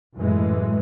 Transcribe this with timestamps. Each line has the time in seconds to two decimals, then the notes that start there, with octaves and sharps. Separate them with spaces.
0.18 F#2 A2 E3 G#3